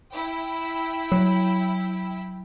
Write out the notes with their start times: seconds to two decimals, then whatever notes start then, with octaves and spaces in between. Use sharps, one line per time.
0.11 E4 G5
1.12 F#3